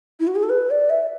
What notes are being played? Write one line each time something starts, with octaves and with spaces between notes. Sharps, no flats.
E4
F#4
G#4
A4
B4
D5
E5